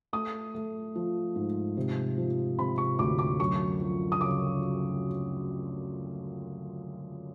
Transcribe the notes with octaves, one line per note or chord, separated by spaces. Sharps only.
A3 D#6
A3
F3
G#2
C3
F3
C3 B5
C#6
D2 D6
D6
F#2 C#6
F3
D#6
C#3 D6